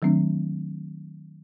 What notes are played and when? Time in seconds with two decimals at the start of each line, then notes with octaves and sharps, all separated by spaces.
0.02 D#3 F#3 A3 C4 D4